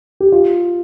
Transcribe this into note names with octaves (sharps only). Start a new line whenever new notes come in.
G4
F4